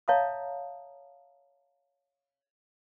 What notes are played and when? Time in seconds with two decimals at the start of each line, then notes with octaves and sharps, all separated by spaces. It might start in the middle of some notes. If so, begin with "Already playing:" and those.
0.08 C#5 E5 F5 A5 A#5 D#6